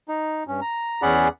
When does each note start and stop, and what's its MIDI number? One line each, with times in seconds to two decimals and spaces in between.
0.09 0.44 63
0.47 0.60 43
0.47 0.60 61
0.61 1.02 82
1.02 1.28 40
1.02 1.28 61
1.02 1.28 68
1.02 1.28 74
1.02 1.28 78
1.02 1.28 83